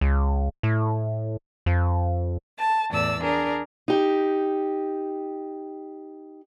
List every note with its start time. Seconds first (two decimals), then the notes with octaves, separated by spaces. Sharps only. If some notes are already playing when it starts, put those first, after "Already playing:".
0.01 C#2
0.63 A2
1.66 F2
2.57 A5
2.89 E2 A2 D5 E6
3.21 D4 G#4 A#4
3.88 D#4 G4